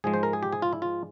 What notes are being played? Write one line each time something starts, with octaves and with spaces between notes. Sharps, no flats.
G#2 F3 G#3 G#4
C5
A#4
G#4
G4
G#4
F4
E4
F4